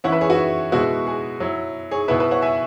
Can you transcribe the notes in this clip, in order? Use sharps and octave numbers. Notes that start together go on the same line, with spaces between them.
E3 C#4 E4 C#5 F#5
B4 E5
G#4 C#5
F#4 B4
B2 G#3 B3 E4 F#4
G#4
F#3 E4
G#4 C#5
B2 B3 E4 B4 E5
B4 E5
C#5 F#5
E5 G#5